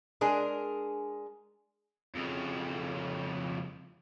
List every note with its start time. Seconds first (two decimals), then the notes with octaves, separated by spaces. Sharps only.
0.21 G#3 D4 G#4 A#4
2.15 F2 C#3